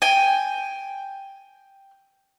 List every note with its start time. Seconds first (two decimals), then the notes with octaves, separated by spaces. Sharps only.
0.02 G5 G#5